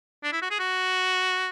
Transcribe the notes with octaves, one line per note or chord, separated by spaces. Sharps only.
D4
E4
F#4
G#4
F#4